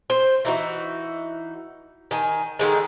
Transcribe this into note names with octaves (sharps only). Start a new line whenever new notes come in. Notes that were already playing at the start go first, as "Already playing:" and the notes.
C5
E3 D#4 F#4
D#3 G#5
D3 D#3 G#3